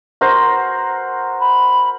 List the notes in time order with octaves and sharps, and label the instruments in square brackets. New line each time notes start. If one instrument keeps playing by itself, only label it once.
[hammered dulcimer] F#4 A#4 C5
[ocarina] B5